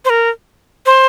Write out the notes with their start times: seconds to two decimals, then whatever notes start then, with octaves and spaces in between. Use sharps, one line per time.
0.05 C5
0.10 A#4
0.86 C5